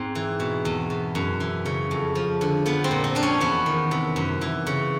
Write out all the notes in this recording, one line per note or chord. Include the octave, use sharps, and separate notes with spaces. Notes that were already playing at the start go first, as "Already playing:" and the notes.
Already playing: G#2 C4
E3
B2
E2
B2
F#2
E3
C#3
F2
F3
D3
F3 B3
C4
A#2
C4
F3 D4
C#4
E2 B3
D#3
C3
F#2
E3
C#3